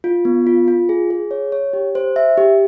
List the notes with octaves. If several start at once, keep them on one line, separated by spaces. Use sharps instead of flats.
F4
B3
F4
F4
G#4
G#4
C#5
C#5
G4
C5
E5
G4